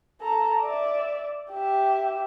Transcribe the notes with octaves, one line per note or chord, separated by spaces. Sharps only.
A4 A#5
D5 E5
G4 E5